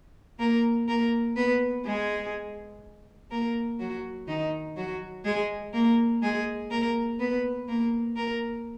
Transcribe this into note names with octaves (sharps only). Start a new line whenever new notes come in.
A#3 A#4
A#3 A#4
B3 B4
G#3 G#4
A#3 A#4
F#3 F#4
D#3 D#4
F#3 F#4
G#3 G#4
A#3 A#4
G#3 G#4
A#3 A#4
B3 B4
A#3 A#4
A#3 A#4